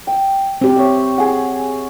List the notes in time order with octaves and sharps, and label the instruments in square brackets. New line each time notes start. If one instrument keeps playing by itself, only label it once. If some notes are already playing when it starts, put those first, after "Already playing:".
[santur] G5
[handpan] C4 G4
[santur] C#5 E5
G#4 F#5